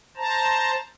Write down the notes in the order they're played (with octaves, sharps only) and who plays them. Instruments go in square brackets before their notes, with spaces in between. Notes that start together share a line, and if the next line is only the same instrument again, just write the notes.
[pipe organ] C5 A5 A#5